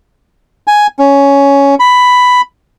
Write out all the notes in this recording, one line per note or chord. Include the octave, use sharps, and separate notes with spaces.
G#5
C#4
B5